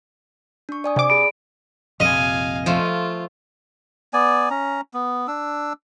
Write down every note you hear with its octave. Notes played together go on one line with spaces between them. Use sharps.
D4 C#6
D5 G#5 D#6
C3 D5 D6
G#4 B5 D7
A#1 F2 C3 D#5 F5 G#5
F3 A3 F4
B3 D5 G#5
C#4 A#5
B3
D4 E6